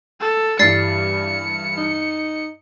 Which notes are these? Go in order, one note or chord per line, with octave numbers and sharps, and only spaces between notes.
A4
G2 E3 G3 D5 A6 C7 C#7
D#4